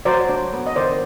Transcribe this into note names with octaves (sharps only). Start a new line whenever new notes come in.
F#3 C5 D5
D4
B3
D#5
D#3 C5 D5